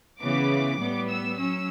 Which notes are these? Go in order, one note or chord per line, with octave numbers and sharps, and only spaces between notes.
C#3 E3 B3 D6
A2 G3 B3
E6
F#3 C#4 E6